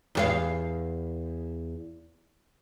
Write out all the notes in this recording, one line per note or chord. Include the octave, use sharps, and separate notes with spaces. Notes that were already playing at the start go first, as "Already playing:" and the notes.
E2 F#4 F5